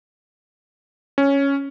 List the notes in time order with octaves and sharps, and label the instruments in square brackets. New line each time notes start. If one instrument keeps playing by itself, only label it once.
[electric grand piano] C#4